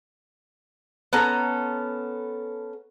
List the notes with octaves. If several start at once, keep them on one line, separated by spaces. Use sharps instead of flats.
B3 C#4 A4 A#5